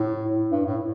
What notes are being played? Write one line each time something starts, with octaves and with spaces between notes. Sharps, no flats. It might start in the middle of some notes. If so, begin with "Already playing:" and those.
Already playing: A2
G2
A2